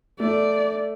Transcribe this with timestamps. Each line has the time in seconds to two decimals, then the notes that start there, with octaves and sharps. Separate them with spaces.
0.20 A3 D5